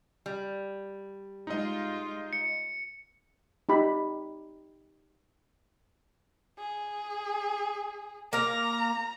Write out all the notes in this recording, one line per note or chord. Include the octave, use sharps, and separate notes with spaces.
G3
G#3 D#4 F4 D#5
C#7
D#4 G4 B5
G#4
A#3 A#4 F5 A#5